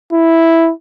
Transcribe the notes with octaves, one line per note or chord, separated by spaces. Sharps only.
E4